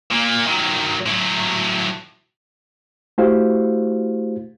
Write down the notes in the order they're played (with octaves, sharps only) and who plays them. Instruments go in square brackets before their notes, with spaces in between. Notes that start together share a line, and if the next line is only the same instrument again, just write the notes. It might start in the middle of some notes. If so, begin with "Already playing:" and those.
[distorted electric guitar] A#2 A#3
D#3 F#3
A2 F#3
[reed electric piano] A3 E4 F#4 G4 C5 F5